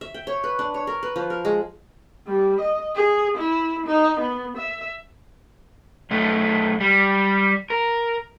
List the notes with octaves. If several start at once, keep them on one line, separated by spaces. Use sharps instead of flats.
E5
G5
C#5
B4
D4
C#5
A#4
B4
F3
A#4
G#3
G3
D#5
G#4
E4
D#4
B3
E5
B1 A3
G3
A#4